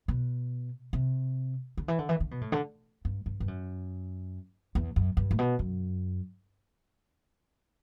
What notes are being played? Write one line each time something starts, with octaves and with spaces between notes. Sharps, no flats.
B2
C3
D3
E3
D3
E3
D3
B2
A2
D3
G2
G2
G2
F#2
E2
F#2
G2
A2
B2
F#2